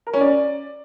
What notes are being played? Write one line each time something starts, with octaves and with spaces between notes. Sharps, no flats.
A#4
C#4
D5